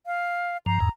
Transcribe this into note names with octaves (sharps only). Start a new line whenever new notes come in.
F5
G2 F3 A#5
E2 G#2